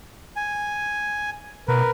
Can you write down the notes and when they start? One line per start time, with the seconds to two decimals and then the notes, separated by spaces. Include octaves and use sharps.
0.36 G#5
1.68 B2 A#4 B4